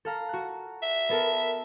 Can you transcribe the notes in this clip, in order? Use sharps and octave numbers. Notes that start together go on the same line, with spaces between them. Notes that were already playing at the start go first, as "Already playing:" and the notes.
A4 F5 A#5
F#4 F#6
E5
B3 A4 A#4